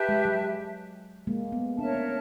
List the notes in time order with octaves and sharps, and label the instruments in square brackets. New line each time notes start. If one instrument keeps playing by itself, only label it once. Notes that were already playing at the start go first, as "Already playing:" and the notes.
Already playing: [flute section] G4 B4 E5 A5
[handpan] G#3
F#3
G#3 A#3
A3 B3
[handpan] C4 D4 [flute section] A#4 C#5 E5 A5
[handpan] B3 C#4